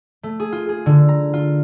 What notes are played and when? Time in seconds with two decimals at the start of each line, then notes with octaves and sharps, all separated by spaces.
0.23 A3
0.40 G#4
0.52 F4
0.69 G#4
0.86 D3
1.09 A#5
1.34 F4